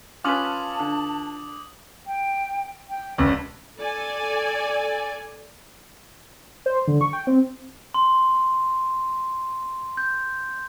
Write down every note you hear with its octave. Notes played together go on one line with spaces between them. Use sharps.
C#4 F4 B4 A5 D6 D#6 F6 F#7
D3
G5
G5
E1 C#2 B4
A4 D5 G#5
C5
D3
C#6
G5
C4
C6
G6